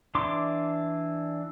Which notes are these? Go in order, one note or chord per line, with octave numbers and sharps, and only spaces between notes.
E3 D4 C6 D6